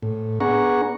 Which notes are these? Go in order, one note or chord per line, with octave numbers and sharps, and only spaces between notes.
A2
B3 D4 G#4 F#5 A#5 C#6